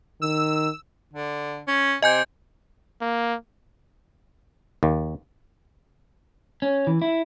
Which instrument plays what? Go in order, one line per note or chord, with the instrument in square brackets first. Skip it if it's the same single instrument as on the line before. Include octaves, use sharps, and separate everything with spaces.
[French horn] D#3 [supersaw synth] E6
[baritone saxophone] D3
C#4
[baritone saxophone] C3 [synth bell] D#5 G#5 G6
[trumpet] A#3
[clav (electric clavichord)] D#2
[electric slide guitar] C#4
E3
E4